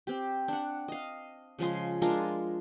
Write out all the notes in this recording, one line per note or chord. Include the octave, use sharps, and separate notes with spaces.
C4 G4
D4 F#5
D#5 F5
C#3 F3 G#3 C6
G#3 D4 F4 A#4